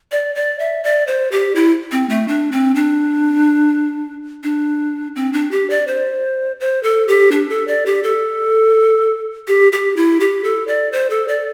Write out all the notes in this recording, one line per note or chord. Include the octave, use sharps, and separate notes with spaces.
D5
D5
E5
D5
C5
G4
E4
C4
A3
D4
C4
D4
D4
C4
D4
G4
D5
C5
C5
A4
G4
D4
A4
D5
G4
A4
G4
G4
E4
G4
A4
D5
C5
A4
D5